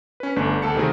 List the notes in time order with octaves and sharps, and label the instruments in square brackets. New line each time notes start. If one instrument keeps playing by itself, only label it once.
[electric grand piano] C#4 B4
G1 A3 D4 G#5
D2 A4 A5 C#7
C3 D#3 A3 C4 F#4 G#4